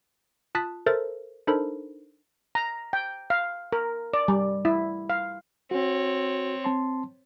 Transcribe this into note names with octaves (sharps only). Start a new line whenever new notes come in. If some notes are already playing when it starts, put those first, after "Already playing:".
F4 A5 D#6 F#6 A6 B6
A4 A#4 C5 E5 A6
D4 D#4 A4 A#4 C5 B5
A#5
G5
F5
A#4
D5
G3
E4
F5
C4 F#4 C#5
C4 A5 C6